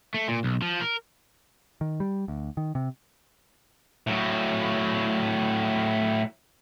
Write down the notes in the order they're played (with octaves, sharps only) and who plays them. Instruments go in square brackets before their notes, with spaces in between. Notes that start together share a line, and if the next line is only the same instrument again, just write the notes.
[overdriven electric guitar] A3
A#2
B1
F3
A#4
[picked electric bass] D#3
G3
D2
D#3
C3
[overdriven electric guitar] A2 F#3